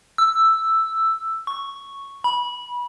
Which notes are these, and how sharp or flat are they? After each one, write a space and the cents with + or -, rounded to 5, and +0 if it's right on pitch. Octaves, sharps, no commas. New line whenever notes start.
E6 +0
C#6 +0
B5 -25